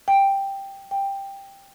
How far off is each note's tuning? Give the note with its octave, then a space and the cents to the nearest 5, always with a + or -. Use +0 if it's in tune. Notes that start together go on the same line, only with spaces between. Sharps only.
G5 +5
G5 +10